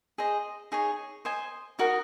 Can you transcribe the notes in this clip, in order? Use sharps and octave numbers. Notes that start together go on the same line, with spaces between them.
G#4 C5 D#5
D#4 G#4 C#5
C5 D#5 G#5
D#4 F#4 A#4 D#5